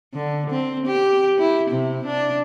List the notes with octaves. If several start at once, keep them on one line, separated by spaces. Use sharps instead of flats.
D3
C4
G4
E4
C3
D4